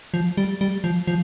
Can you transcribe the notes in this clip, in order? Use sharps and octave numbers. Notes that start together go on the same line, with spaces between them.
F3
G3
G3
F3
F3